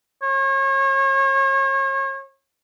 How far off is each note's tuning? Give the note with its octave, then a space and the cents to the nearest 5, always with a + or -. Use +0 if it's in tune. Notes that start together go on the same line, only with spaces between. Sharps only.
C#5 -35